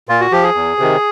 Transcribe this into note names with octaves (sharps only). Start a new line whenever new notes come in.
A#2 F4
F#4
F3 G4
G#4
E2
C3 D#3